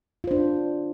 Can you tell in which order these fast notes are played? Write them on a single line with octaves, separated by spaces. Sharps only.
F4 C5 D4